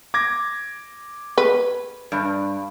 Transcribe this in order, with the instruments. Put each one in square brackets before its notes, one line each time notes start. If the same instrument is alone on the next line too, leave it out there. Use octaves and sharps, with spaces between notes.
[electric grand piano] D6 G#6 A#6
[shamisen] B4
[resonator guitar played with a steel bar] G2